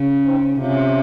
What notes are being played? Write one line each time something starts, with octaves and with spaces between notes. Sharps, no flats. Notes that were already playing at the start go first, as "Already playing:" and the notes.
Already playing: C#3
C4 D#4
C3 C#4 F4